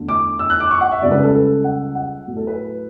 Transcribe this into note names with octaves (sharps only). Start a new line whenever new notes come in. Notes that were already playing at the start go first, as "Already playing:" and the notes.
Already playing: E2 D3 A3
D6
E6
F#6
D6
C#6
F#5
E5
C#2 C#3 G3 D5
B4
A4
A4
F#5
F#5
A2 F#3 A3
A4
B4